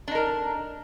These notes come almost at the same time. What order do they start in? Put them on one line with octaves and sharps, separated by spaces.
D4 D#4 A#4